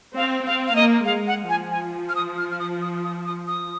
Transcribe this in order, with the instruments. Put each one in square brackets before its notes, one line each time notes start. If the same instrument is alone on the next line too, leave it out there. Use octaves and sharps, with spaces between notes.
[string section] C4 [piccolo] F5
[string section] C4 [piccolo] F5
[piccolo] F5
[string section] A#3 [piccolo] D#5
[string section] G#3 [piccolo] F5
[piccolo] F#5
[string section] F3 [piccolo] G#5
[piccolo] G#5
F6
D#6
F6
F6
D#6
D#6
D#6
D#6
D#6